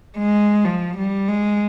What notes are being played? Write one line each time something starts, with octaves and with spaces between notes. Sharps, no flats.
G#3
F3
G3
G#3